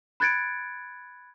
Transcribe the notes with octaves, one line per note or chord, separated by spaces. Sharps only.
B5 F#6 G#6 A6 C#7 D7